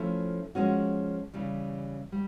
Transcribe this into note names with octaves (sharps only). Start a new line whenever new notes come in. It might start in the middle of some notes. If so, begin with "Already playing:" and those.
Already playing: F3 A3 C#4 E4
F3 G#3 C#4 F#4
C#3 E3 G3
G3